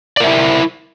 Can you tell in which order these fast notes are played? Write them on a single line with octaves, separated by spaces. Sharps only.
D5 A#4 E5 E4